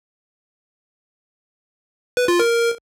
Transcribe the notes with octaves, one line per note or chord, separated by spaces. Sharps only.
B4
F4
A#4